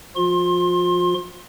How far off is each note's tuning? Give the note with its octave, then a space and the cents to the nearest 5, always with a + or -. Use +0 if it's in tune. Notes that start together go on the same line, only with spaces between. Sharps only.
F3 +0 F4 +35 C6 +25